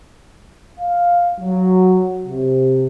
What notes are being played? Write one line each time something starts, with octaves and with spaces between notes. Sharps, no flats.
F5
F#3
C3